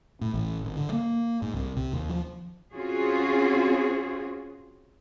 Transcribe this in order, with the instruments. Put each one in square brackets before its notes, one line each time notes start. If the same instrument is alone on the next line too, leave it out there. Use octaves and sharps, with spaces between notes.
[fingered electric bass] A2
A1
G#1
D3
A#3
G#2
C2
C3
D#2
F3
[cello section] C4 C#4 F4 F#4 G#4